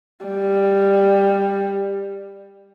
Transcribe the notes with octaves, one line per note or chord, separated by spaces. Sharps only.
G3